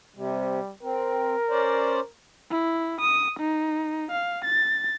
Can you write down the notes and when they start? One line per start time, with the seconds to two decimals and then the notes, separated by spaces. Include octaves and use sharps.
0.16 C3 G3
0.83 C4 A#4
1.50 C#4 C5 D5
2.51 E4
3.01 D#6
3.40 D#4
4.12 F5
4.45 A6